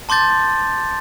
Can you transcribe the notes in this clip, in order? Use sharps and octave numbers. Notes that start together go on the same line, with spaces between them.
A5 C6 D6 G6 A6